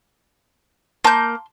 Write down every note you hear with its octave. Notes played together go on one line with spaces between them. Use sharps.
A#3 A5 C6 G6